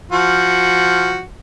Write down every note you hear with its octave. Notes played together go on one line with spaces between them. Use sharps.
F3 F#4